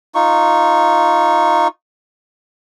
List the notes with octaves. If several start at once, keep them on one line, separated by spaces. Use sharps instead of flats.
D#4 F4 C#6